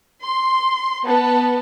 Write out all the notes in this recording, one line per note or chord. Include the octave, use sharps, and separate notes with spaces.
C6
B3 A5